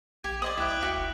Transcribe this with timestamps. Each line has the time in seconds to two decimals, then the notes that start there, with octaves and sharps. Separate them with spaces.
0.24 A#1 G4 G#6
0.42 C5 D5 D#5 D#6 F#7
0.57 C#2 E4 G5 D6 F#6
0.82 D2 E4 F#4
0.96 F1